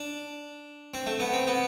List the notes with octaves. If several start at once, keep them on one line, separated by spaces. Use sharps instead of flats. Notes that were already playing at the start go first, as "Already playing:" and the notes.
Already playing: D4
C4
A3
B3
C4
B3